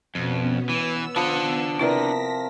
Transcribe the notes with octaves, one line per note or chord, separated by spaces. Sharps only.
F2 B2 B3 C#4
E3 B3 E6
F3 D4 F#5 B5
C3 E4 A#4 B4 D5 A#6 B6